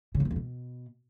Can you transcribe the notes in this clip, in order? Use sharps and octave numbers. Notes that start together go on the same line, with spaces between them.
C#3
F2
F#2
F2
B2